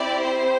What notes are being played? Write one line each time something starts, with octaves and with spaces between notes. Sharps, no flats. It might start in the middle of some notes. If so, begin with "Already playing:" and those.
Already playing: C4 E4 G4 D5
C5